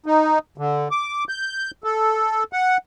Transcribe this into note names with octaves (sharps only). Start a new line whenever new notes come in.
D#4
D3
D6
G6
A4
F#5